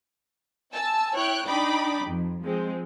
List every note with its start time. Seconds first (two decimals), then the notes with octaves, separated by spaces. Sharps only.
0.74 G#5 A5 E6
1.15 E4 C#5 G5 F#6
1.47 D4 D#4 G5 B5 D6
2.05 F2
2.42 F3 G#3 C4